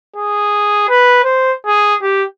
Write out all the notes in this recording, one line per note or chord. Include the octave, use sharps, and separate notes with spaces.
G#4
B4
C5
G#4
G4